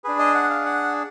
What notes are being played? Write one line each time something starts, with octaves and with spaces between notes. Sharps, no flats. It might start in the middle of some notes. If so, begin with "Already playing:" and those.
D4 G#4 B4
D#5
F#5
F5
F#5